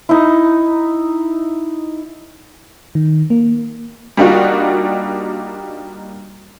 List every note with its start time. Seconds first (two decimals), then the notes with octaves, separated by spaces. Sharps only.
0.09 D#4 E4
2.95 D#3
3.30 A#3
4.17 G3 A#3 D4 D#4 F4 F#4